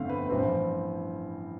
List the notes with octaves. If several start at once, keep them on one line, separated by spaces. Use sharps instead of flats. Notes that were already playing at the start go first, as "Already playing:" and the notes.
Already playing: G1 F2 D3 A3 C4 E5 F5
B4
A1 G2 F3 C4 B4